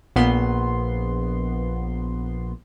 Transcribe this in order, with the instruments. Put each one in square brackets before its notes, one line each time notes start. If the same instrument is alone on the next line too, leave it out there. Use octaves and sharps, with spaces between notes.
[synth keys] A#1 B3 C6